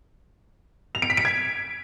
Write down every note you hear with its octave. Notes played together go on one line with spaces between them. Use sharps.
F7
D7
B6
D7
G#6